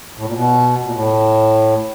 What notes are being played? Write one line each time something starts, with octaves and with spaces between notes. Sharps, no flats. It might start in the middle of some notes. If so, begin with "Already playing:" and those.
A2
A#2
B2
A#2
A2